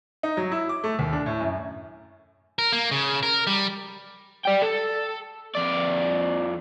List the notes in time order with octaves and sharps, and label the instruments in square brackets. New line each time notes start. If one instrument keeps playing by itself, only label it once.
[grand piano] D#4
F#3
E4
D6
A3
D#2
D4
A2
F#2
[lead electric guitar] A#4
A#3
C#3
A#4
G3
[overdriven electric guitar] D5 G5
A4
F2 D5